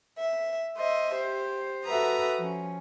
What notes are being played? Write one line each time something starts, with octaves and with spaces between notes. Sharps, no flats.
E5
C5 D#5 E5
G4 C5
F#4 A4 B4 E5 A#5 D#6
F3 C#4